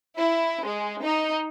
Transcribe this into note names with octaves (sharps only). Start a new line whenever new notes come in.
E4
G#3
D#4